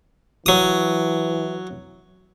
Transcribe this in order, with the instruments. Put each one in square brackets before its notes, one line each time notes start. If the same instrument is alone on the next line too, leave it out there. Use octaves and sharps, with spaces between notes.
[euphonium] E3 [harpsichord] F#3 D#6